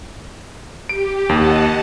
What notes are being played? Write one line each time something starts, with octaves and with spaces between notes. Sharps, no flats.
G4 D7
D#2 D#5 F#5 A5